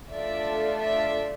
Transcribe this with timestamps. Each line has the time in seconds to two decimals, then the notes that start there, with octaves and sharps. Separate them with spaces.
0.11 A3 D4 F4 A4 D5 E5
0.79 D5 E5